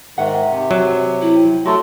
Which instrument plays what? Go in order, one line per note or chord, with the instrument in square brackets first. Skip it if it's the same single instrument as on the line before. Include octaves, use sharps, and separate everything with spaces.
[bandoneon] G#2 D#3 [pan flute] E5 [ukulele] F#5
[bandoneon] C3
[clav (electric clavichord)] F#3
[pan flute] E4
[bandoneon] F#3 A3 [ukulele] F#4 D5 [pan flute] C6